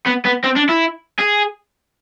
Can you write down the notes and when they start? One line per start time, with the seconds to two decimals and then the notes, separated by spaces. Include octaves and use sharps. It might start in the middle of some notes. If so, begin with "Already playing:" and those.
0.07 B3
0.25 B3
0.44 C4
0.56 D4
0.69 E4
1.19 G#4